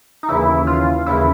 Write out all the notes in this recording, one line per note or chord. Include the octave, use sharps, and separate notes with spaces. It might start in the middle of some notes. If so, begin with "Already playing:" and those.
D#4
D#2 C#3 E3 E4
F4
D#2 C#3 E3 E4